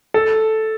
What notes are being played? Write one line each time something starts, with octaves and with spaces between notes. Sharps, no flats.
A4